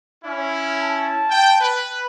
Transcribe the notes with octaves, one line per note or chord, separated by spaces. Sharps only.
C#4 E4
A5
G5
B4